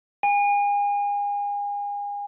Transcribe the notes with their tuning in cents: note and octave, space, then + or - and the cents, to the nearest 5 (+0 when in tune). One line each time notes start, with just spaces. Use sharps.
G#5 -35